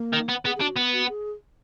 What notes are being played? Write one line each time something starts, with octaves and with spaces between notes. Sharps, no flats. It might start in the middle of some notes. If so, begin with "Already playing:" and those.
Already playing: A#3
D#3
B3
B3 G#4
G#4
D4 F#4
B3
F#4
G#4